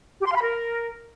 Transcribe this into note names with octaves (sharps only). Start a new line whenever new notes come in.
G4
C6
F5
B5
A#4